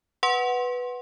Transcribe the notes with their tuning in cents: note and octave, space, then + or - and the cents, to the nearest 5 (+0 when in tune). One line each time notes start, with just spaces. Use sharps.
B4 +0 F#5 +0 C6 +25